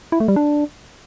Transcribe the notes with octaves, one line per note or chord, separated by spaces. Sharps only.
E4
A3
G3
D4